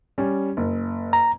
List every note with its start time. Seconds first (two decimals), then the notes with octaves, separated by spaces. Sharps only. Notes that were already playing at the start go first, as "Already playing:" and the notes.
0.18 G3 C#4
0.57 F#1
1.13 A#5